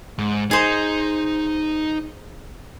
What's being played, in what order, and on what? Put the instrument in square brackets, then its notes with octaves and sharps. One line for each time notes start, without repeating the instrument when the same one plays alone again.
[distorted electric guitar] G#2
[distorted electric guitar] D#4 [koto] G#4 C5